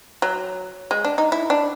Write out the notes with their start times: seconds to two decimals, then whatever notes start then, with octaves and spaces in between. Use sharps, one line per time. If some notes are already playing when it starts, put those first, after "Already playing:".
0.22 F#3
0.91 G#3
1.05 D4
1.18 D#4
1.32 E4
1.50 D4